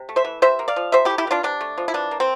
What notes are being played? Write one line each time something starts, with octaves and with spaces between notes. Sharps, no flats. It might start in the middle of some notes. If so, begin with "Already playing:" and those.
Already playing: C3
A3
C5 E5
E3
C3 C5 E5
A#3
D5 F5
F3
C3 C5 E5
E4 G4
A3
E4 G4
E3 D4 F4
C3 D4
A3
F3
E4
E3 D4
A#3
C4